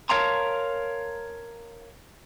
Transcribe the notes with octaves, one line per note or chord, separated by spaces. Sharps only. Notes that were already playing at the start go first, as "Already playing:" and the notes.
A#4 C#5 F5 A5 A#5 C6